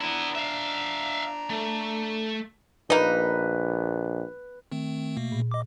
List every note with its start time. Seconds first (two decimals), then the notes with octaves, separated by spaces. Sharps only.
0.01 B3 D4 E4 A#5
0.35 E5 F5
1.50 A3
2.90 A#1 A#3 D#4 B4
4.72 D#3 A3 C4
5.17 B2 A3 A#3
5.32 A#2
5.51 D#5 D6